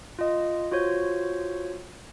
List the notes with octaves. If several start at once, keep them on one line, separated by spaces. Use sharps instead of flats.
F4 D#5
F4 F#4 C5 C#5